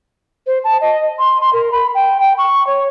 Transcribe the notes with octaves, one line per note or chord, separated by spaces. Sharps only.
C5
A5
D#5
C6
C6
A#4
B5
G5
G5
C#6
C#5